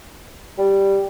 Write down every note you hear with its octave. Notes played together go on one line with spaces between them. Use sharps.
G3